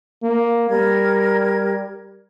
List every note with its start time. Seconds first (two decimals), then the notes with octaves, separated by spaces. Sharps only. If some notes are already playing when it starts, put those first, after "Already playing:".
0.23 A#3
0.70 G3 A#4 G#6